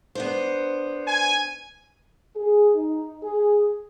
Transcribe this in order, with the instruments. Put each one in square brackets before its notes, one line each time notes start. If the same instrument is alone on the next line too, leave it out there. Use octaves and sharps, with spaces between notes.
[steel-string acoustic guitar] B3 D4 C5
[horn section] G#5
[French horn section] G#4
D#4
G#4